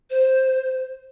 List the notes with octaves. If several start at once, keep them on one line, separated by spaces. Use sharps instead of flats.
C5